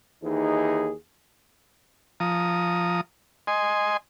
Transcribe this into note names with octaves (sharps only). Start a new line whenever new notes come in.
D#2 E3 D#4 G#4
F3 A#5 D#6
D#5 G#5 C6